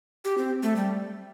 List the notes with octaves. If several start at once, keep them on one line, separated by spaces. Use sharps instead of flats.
G4
C4
A3
G3